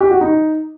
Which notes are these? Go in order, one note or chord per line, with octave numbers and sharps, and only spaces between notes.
G4
F#4
D#4